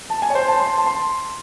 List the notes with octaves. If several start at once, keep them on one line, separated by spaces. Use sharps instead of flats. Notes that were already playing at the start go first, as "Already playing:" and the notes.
A5
G#5
C#5
C5
A5
C6
A5
C6